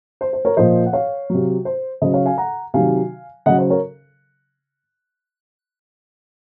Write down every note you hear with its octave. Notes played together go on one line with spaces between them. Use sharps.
C5
C5
A#4 C#5
A#2 F3 C5 D#5
F#5
C#5 F5
C3 F#3
C5
C#3 F#3 C5 D#5
C#5 F5
F5 G#5
F#5 A#5
C3 D#3 F#3 F5 G#5
C#3 F#3 D#5 F#5
C5
A#4 C#5